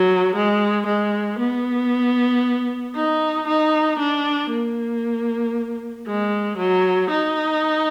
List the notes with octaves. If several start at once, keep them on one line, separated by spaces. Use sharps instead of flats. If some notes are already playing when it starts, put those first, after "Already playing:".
Already playing: F#3
G#3
G#3
B3
D#4
D#4
D4
A#3
G#3
F#3
D#4